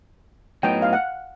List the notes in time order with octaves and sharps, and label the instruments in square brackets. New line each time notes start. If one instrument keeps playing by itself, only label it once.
[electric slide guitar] A2 F#3 B3 D#4 [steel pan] G5
[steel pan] F5
F#5